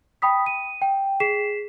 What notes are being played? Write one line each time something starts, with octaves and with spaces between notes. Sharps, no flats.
G5 B5 D#6 B6
D#7
G5
G#4 B6 C7 E7